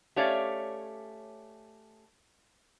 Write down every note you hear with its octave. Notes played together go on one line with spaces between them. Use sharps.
A3 C#4 G4 C#5 D5 F5